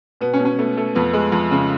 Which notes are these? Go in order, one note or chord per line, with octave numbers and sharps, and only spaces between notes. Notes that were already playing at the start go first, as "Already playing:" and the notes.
B2 B3
C#4
B2
C#4
A3 B3
A3
F2 B3
G#3
F2
C#3